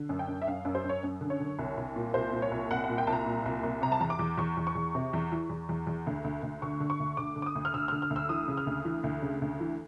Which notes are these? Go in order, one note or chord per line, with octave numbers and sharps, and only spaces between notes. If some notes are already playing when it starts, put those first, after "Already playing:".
Already playing: D3
F#2
G5
F#2
E5
F#2 F5
F#2
C5
F#2
C#5
F#2
D3
C#5
D3
C2
C2
A#2
C2 C5
A#2
C#5
C2
C2 F#5
F#5
A#2
G5
C2 A5
A#5
A#2
C2
C2
C3 A#5
A5
E2 A#5
D6
E2
E2 C#6
E2
C#6
E2
C3
E2
E3
E2
E2
E2
D2
D2
D2
D3 C#6
D3
C#6
D2
D3 D6
D3
D6
D#6
D2
F6
D3 E6
D3 F6
F6
D2
E6
E3 D#6
C#3
F6
D2
E3
D2
C#3
D2
E3